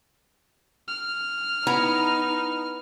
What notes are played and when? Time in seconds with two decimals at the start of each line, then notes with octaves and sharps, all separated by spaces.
0.88 F6
1.67 B3 D#4 E4 A#5